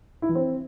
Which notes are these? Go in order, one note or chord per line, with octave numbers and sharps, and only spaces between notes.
E4
E3
C4